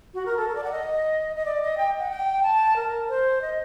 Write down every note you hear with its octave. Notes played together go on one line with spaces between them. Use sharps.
F#4
A#4
A4
A#4
D5
F#5
D#5
D#5
D5
D#5
G5
F#5
G5
A5
A#4
C5
D#5